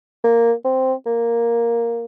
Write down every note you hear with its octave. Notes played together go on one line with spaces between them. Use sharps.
A#3
C4
A#3